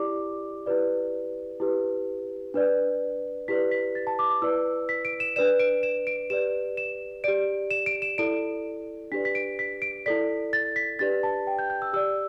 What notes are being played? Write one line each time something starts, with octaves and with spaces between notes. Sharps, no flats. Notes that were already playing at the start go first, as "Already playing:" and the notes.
Already playing: E4 G4 D5 D6
E4 G4 B4 D5
E4 G4 B4
D4 B4 D5
E4 G4 B4 D5 B6
B6
A6
A5
D6
D6
E4 B4 D5 E6
B6
D7
E7
D4 B4 D5 E7
D7
E7
D7
G4 B4 D5 E7
E7
G4 D5 D7
E7
D7
E7
E4 A4 D5 D7
D4 G4 B4 D5 B6
B6
D7
B6
D7
E4 A4 D5 B6
A6
B6
D4 G4 B4 D5 A6
A5
G5
G6
G6
E6
G4 D5 E6